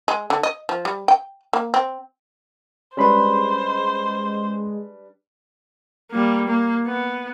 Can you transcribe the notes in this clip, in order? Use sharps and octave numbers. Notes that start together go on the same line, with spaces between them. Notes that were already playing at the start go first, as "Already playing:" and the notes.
G#3
D3
D#5
F3
G3
G5
A#3
C4
G3 G#3 C#4 D4 B4 C5 B5 C6
G3 A#3
A#3
B3